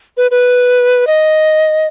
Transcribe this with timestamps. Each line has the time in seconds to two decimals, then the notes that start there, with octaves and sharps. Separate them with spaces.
0.17 B4
0.31 B4
1.07 D#5